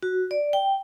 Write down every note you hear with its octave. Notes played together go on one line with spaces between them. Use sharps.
F#4
D5
G5